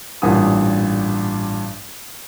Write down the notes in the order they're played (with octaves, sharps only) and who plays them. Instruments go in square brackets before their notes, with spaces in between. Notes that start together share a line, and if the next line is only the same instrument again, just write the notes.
[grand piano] A1 G2 A#2 F#5 G#5 D#6